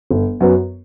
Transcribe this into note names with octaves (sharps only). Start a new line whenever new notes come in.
G1
F#2 F#3 B3